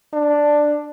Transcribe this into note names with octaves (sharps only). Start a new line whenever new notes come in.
D4